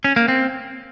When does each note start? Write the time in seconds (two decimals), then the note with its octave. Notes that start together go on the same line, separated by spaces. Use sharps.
0.04 C#4
0.16 A#3
0.28 C4